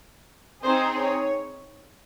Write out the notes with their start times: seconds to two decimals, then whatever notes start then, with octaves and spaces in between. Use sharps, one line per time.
0.64 C4 D#4 G#4 C5
0.95 C#5